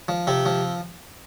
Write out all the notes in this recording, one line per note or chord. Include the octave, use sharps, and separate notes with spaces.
F3
C3 C4
F3